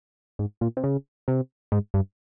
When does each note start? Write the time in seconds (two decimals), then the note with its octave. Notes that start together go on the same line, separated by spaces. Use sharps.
0.39 G#2
0.61 A#2
0.77 C3
0.84 C#3
1.28 C3
1.72 G#2
1.94 G2